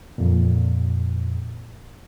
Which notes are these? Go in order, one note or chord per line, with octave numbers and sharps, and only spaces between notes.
F2 A#2